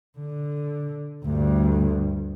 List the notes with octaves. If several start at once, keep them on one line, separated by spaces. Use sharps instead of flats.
D3
D2 G2